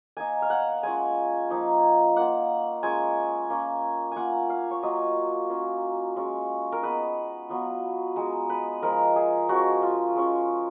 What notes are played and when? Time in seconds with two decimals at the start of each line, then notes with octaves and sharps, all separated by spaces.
0.17 A#3 D#4 G#5
0.42 F5
0.50 F#5
0.83 G#3 C#4 F4 G#5
1.50 F3 A#3 D#4
2.16 A#3 F4 F#5
2.83 G#3 C#4 F4 G#5
3.50 A#3 C#4 F4
4.12 A#3 F4 F#5 G#5
4.49 F5
4.71 C#5
4.83 F#3 A#3 F4 D#5
5.49 F#3 A#3 C#4 F4
6.16 G#3 C#4 F4
6.72 A#4
6.83 G#3 B3 D#4 B4
7.49 F#3 B3 F4
8.16 G#3 D#4
8.49 B4
8.82 F3 G#3 D#4 A#4
9.16 G#4
9.49 F3 G#3 C#4 F#4
9.82 F4
10.16 G#3 C#4 F4